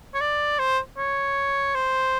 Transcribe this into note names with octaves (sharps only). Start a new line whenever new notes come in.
C#5
D5
C5
C#5
C5